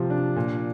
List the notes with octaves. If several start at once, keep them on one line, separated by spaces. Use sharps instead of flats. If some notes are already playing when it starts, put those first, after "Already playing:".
Already playing: C3 F3
D4
A#2